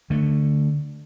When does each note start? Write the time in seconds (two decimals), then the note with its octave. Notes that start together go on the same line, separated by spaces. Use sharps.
0.10 D3 A3